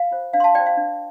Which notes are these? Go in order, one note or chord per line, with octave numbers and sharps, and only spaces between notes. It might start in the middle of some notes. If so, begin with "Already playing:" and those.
Already playing: F5
F4 C5
D4 F5
C6
F5 A5
F4 C5 D5 G5
F5
D4